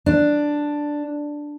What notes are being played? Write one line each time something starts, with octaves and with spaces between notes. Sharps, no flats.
D4